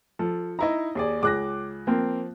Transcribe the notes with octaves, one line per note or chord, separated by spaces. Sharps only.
F3 A4
D#4 E4 D#5 A#5
D#2 G#4 D5
C#2 G#4 D6 F#6 A#6
F3 A#3 C4